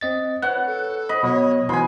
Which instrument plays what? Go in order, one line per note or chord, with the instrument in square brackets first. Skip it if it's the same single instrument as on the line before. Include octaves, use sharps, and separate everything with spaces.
[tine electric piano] C4 D#5 A6
[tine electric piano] B4 C#5 [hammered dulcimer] F#5
[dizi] A4
[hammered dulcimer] D#5 [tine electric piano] B5
[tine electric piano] B2 F#3 [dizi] C#5
[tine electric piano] B2 E3 F#3 [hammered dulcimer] G#5 C6 [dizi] B5